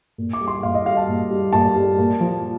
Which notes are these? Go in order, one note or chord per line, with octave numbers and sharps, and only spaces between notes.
A#2
D6
G3
C6
A#2 F5
D#5
G3 F5
A5
A#2
G3
A#2 A5
G3
A#2
F3